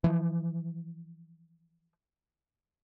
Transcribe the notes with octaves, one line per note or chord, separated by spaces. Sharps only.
E3 F3